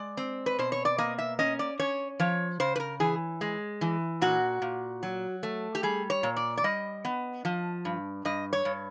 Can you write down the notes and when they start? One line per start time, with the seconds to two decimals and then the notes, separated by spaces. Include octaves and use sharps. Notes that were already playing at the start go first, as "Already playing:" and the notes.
Already playing: G#3 D5
0.17 C4
0.46 B4
0.59 B2 C5
0.72 C#5
0.85 D5
0.98 A#3 D#5
1.18 E5
1.39 C#4 D#5
1.59 D5
1.79 C#4 C#5
2.20 F3 C#5
2.60 C#3 C5
2.76 B4
2.80 A#4
3.00 E3 G#4
3.41 G#3
3.81 E3
4.21 A#2 F#4
4.62 A#2
5.03 F#3
5.43 A3
5.75 G4
5.83 G3 G#4
6.10 C#5
6.23 A#2
6.36 D5
6.57 D5
6.64 G3 D#5
7.05 B3
7.45 F3
7.85 G2
8.25 G2 D#5
8.53 C#5
8.65 G2